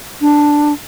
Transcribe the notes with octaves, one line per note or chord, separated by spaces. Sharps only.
D4